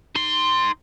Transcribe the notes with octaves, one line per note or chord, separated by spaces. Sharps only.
D#4 C6